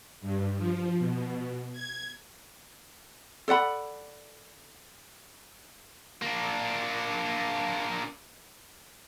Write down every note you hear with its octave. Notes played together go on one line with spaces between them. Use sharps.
G2
F3
B2
G#6
A4 D5 F#5 B5
A#3 D4